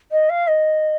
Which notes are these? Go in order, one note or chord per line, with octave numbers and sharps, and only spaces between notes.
D#5
F5
D#5